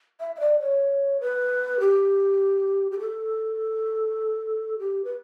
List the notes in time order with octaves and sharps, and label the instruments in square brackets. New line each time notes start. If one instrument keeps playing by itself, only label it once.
[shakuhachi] E5
E5
D5
C#5
B4
G4
G4
A4
G4
B4